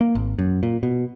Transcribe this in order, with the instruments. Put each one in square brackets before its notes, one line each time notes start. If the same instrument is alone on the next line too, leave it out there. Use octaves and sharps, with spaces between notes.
[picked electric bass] A#3
G#1
F#2
A#2
B2